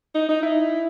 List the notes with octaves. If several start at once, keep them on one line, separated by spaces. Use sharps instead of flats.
D#4
D#4
E4